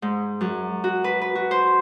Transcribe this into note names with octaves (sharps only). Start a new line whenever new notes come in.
G#2
F#2
F#4
B4
B4
F#4
C5